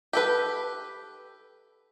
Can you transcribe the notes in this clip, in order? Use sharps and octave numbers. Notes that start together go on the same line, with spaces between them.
G4 A4 B4